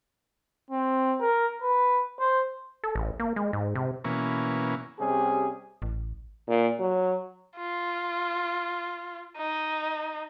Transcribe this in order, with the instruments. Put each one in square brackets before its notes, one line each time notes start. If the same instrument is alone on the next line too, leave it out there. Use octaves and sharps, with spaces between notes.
[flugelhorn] C4
A#4
B4
C5
[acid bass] A4
A1
A#3
G#3
G#2
C3
[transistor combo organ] B2 E3 A#3 C#4
[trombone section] C3 G3 C#4 G4 G#4
[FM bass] A1
[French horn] A#2
F#3
[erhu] F4
D#4